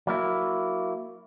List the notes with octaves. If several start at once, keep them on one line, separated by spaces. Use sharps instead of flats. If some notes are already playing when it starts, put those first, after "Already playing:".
F#3 A#3 E4